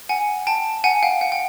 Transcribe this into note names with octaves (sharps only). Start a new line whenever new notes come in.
F#5 G#5
G5 A5
F#5 G#5
F5 G5
F#5
G5